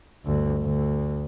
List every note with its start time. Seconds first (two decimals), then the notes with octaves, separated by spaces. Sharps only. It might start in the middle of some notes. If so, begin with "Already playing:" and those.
0.25 G1 D2
0.63 D2